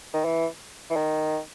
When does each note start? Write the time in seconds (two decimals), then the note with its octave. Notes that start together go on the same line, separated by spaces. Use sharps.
0.14 D#3
0.25 E3
0.90 E3
0.96 D#3